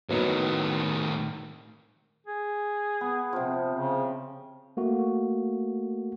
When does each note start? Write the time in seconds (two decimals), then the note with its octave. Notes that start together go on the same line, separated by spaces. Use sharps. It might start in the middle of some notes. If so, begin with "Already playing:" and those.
0.09 A2 D#3 F#3 B3 D#4
2.27 G#4
3.01 B3
3.33 C3 F3
3.73 C#3
4.77 A3 A#3 F#4